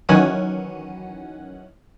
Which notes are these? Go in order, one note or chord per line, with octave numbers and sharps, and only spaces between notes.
D#3 E3 F#3 C#4 F#5 D#7